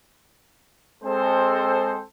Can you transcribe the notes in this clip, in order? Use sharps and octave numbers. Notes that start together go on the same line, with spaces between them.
G#3 C4 A4 C5